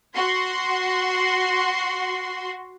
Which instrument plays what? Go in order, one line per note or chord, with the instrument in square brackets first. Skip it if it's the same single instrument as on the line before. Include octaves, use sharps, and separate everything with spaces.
[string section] F#4 C6